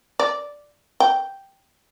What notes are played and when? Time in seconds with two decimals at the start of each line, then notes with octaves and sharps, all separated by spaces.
0.20 D5
1.00 G5